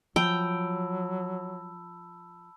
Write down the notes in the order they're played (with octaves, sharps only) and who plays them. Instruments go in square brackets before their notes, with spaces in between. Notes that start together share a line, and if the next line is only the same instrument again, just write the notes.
[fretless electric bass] F3 [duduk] F#3 [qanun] G5 [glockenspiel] A5 B5 E6